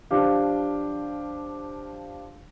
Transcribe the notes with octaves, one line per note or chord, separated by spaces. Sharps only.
F3 D4 G4 F5